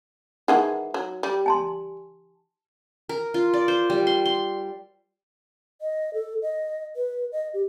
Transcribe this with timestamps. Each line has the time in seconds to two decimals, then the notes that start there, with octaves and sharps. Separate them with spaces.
0.48 D#3 E3 G#3 D#4 F#5
0.94 F#3
1.23 G3
1.46 G#5 A5 C6
3.09 A#4
3.34 F4
3.54 D5
3.68 C5
3.90 G3
4.07 C6
4.25 C6
5.82 D#5
6.14 A4
6.42 D#5
6.96 B4
7.32 D#5
7.54 G4